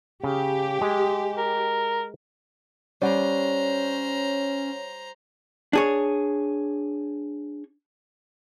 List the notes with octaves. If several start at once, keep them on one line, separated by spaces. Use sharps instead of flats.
C#3 G4
G#3
A#4
G3 C#4 C5 C#5 F#5 A#5
D4 G#4 C#5